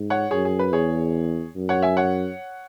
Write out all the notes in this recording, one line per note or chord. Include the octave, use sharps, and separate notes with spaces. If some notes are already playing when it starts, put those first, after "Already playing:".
Already playing: G#2
C#5 F#5
F#2 G#4 C#5
G#4
B4
E2 G#4 C#5
F#2
C#5 F#5
E5 G#5
C#5 F#5